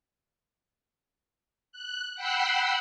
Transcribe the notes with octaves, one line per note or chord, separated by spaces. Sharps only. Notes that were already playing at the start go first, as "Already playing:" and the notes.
F#6
F#5 G5 B5 E6 F#6 C7